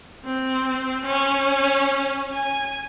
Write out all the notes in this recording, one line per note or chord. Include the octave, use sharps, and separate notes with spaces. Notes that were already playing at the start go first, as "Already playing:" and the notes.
C4
C#4
G#5